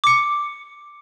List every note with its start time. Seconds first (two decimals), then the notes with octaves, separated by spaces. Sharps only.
0.04 D6 C#7